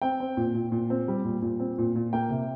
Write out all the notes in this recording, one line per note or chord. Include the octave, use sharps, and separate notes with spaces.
C4 G5
C4
A#2
A#2
A#2
C4
G3
A#2
A#2
C4
A#2
A#2
A#3 G5
C3